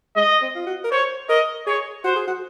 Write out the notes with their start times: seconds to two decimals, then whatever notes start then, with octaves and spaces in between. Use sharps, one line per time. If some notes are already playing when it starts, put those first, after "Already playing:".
0.16 G#3 D#5
0.41 C4
0.55 F4
0.66 F#4
0.84 A#4
0.92 C5 C#5
1.29 A#4 D#5
1.67 G#4 C#5
2.04 F#4 C5
2.16 G#4
2.27 F#4